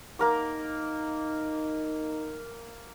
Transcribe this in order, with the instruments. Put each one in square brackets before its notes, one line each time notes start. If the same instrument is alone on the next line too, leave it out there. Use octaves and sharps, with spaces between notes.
[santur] A#3 A#4 D6 [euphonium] D#4